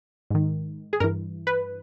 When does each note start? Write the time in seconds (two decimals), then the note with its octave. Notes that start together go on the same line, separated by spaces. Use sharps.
0.30 G#2 D#3
0.93 G#4
1.00 G2 E3 A#4
1.47 B4